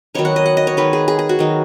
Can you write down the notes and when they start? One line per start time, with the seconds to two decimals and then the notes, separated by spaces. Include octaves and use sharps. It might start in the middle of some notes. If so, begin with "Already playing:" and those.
0.15 D#3 F#3 B3 D#4 C#5
0.25 F#5
0.36 D#5
0.46 F#5
0.57 D#5
0.67 C#5
0.77 D#3 G#3 D#4 B4
0.93 G#4
1.08 G#4
1.19 G#4
1.29 F#4
1.39 D#3 F#3 D#4